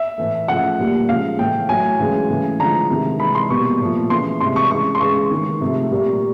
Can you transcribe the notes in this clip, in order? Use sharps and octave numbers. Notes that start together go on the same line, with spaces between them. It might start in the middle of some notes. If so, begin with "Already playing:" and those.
Already playing: E5
A2 E3 A3
C#3 F3 A3 F#5
A#2 G3 A#3
C#3 F3 G#3 F5
A2 E3 A3 G5
A2 F#3 A3 G#5
C#3 E3 G#3
C#3 E3 A3
D3 F3 G#3 A#5
C3 D#3 G#3
C3 E3 G#3 B5
C6
B2 G3 A#3 C#6
A#2 F3 A3
C#3 E3 A3 C6
C3 E3 G#3 C6
C#6
C#3 E3 G#3 C#6
C6
C#3 E3 G#3 C#6
D#3 G#3
C3 F3 A3
A#2 G3 A#3